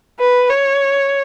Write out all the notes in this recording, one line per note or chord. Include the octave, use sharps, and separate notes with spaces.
B4
C#5